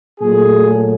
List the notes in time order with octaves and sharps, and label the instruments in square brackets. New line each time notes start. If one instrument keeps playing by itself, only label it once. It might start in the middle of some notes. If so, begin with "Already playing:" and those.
[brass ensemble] A#2 F#3 A3 G#4